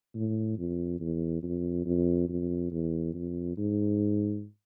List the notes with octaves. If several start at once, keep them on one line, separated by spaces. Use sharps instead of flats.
A2
F2
E2
F2
F2
F2
E2
F2
G#2